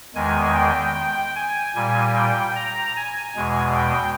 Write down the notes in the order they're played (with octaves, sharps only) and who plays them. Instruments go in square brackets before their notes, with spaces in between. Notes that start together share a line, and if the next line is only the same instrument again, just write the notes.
[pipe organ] E2 D#3 G#3 G#5
G5
G5
G#5
A#2 G3 G#5
G5
A#5
G#5
E2 B2 G#3
G5